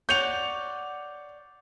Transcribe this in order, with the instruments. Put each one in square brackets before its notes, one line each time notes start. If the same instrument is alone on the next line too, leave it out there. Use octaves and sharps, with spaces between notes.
[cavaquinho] C#5 D5 F#5 [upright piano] G6 C#7 F7